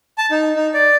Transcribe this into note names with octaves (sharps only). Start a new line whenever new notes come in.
A5
D#4
D#4
D5